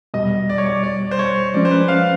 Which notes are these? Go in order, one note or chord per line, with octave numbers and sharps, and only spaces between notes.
E2 B2 G3 D#5
D5
C#5
D5
D5
C5
C#5
F3 G#3 C#4 D5
C5
B4
F5